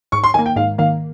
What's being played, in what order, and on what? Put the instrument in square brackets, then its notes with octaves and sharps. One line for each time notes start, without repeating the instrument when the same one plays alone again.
[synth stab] G#2 [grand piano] C#6
[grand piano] C6
[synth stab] D#3 A#3 [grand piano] G#5
[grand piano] G5
[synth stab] G#2 [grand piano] F5
[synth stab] D#3 A#3 [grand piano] F5